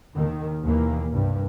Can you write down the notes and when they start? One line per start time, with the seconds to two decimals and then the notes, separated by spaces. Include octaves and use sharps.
0.15 D#2 D#3
0.64 D#2 B2 D#3 E3 A#3
1.12 C2 G2